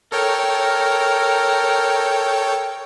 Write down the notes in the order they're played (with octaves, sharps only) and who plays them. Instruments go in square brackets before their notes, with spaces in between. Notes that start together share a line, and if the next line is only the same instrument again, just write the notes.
[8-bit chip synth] A4 C#5 G5 [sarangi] A#4